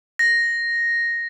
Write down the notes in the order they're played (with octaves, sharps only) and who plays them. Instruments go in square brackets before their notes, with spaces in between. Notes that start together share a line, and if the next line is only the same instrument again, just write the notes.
[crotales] A#6